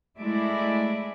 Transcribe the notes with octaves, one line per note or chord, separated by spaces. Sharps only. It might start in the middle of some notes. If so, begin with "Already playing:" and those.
G#3 A3 E4 D5